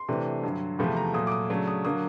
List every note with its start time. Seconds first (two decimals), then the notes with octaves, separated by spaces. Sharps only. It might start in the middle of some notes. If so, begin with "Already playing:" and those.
Already playing: C6
0.08 C3 E3 A3 D4
0.43 G2 D3 F#3
0.79 E2 C3 F3 A3 B5
0.97 A#5
1.14 A#2 F#3 A3 D#6
1.27 D6
1.32 D#6
1.50 C#3 F#3 A3 D4
1.67 D#6
1.85 D3 F#3 A#3 D#6